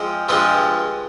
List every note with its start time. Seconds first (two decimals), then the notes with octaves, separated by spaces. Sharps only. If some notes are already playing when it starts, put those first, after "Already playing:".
Already playing: F3 G#3 C4
0.29 G2 F3 G#3 C4